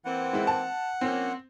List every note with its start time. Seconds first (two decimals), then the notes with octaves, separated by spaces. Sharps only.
0.05 E3 A#3 C4 F#5
0.33 G#3 E4
0.47 A5
1.01 F3 A#3 C4 C#4